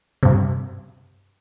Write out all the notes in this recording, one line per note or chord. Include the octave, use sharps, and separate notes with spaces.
G2 C3